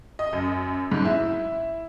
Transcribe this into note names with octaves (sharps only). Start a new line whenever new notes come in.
D#5
F#2
G#2
E4